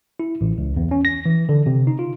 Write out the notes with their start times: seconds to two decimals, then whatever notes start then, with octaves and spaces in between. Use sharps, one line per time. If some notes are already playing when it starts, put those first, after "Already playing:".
0.20 E4
0.41 A1
0.58 C#2
0.76 E2
0.91 C#4
1.05 A#6
1.26 E3
1.49 D3
1.66 C3
1.87 D#4
1.99 F4